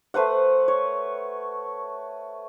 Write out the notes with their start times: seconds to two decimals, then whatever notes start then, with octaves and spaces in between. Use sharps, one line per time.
0.14 A3 B4 C5 F#5
0.68 C#5